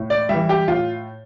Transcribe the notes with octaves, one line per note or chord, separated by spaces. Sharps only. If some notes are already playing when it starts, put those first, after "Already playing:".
Already playing: A2
D5
E3 G3 E5
G4
A2 F4